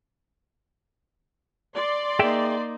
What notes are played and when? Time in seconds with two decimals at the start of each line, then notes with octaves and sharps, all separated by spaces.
1.76 D5 C6
2.19 A#3 D#4 G#4 E5 G5